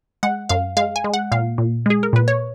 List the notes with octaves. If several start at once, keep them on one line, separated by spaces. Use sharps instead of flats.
G#3 F#5
F#2 F5
G#3 F5
G#5
G#3
F#5
A#2 F5
A#2
G#3 G#4
A#4
A#2 B4
C#5